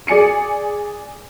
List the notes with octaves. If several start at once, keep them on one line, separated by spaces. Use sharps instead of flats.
G#4 D5 G#5 C#7 D#7